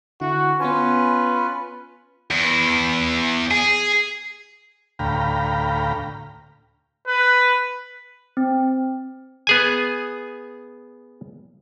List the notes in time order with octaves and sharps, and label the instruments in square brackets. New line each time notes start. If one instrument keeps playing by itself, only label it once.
[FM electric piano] D3 E4 [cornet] F#4
[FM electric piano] B3 G#5 [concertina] C#4 F4 [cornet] B4
[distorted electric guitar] E2
G#4
[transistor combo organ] D2 A2 F5 G5 A#5 B5
[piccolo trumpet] B4
[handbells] C4
[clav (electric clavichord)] B3 G#4 G#5